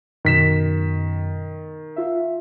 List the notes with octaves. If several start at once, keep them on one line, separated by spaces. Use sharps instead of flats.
F#2 B2 D#3 B6 E7
F4 E5